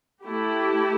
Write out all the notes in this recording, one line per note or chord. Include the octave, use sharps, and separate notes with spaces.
A3 E4 G4